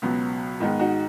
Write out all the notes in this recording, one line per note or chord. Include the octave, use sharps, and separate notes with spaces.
C#2 B2 F#3 B3
G#2 D#3 G#3 B3 D#4
D#4 F#4